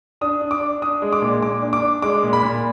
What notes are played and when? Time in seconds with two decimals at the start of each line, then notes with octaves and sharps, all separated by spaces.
0.21 D4 D#6
0.42 D4
0.51 D6
0.61 D4
0.81 D4 D#6
1.02 G#3
1.13 D6
1.22 A#2
1.42 A#2 D6
1.62 D4
1.73 D6
1.82 D4
2.02 G#3 D6
2.23 A#2
2.33 B5
2.43 A#2